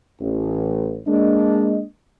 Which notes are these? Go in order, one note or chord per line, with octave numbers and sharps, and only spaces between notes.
A1
G#3 A#3 D4 D#5